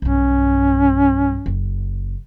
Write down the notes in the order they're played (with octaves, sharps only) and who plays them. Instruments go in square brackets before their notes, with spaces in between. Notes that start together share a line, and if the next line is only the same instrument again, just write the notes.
[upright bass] B1 G2 [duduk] C#4
[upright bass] F#1